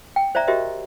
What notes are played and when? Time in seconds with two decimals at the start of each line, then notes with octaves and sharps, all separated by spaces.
0.16 G5
0.35 C5 D5 E5 A#5
0.47 F#4 G4 A#4 C5 D#5 E5